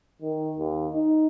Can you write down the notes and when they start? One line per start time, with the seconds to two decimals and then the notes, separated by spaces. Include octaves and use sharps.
0.22 D#3
0.59 D#2
0.93 D#4